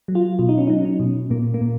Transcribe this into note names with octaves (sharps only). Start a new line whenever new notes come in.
F#3
F4
B2 F4
D#4
C#4
F#3 D#4
C#4
B2
A#2 A#3
A#3
A#2